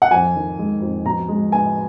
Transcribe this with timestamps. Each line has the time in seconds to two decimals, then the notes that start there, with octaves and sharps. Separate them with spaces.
0.02 F#5
0.11 F2 G#5
0.36 D#3
0.59 G#3
0.82 F2
1.04 B2 A#5
1.28 G#3
1.52 B3 G#5